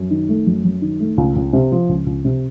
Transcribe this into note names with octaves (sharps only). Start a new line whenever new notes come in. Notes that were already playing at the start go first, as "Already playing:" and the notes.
Already playing: F#2
D#3
A3
F#2
F#2
D#3
A3
C#2
C#2
C3
F3
C#2
C#2
C3